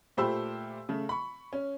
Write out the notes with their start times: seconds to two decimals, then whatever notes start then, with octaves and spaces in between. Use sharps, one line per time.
0.17 A#2 A3 G4 C5 B5 E6
0.89 C#3 A3
1.09 B5 C#6
1.53 C#4